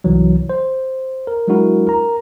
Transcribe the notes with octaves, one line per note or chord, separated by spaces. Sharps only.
C2 E3 F#3
C5
A#4
F#3 G#3 D4 E4 F#4 A#4
A#4 A#5